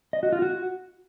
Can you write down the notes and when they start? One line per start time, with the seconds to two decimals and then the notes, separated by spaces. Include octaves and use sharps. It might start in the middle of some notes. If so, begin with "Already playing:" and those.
0.13 D#5
0.23 F#4
0.32 F4
0.42 F#4